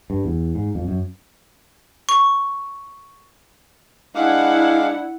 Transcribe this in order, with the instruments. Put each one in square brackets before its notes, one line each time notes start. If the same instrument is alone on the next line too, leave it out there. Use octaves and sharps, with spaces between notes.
[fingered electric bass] G2
E2
G#2
F2
F#2
[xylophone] C#6
[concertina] G#3 F5 D6 [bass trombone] D4 [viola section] E4 F#5